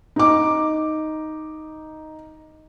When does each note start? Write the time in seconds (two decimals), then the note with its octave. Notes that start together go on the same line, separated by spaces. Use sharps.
0.16 D#4 D6